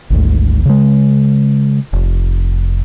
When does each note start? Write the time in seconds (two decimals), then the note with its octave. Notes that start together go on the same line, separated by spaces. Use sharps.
0.10 G#1 D2 G#2
0.65 C#3 G#3
1.93 F1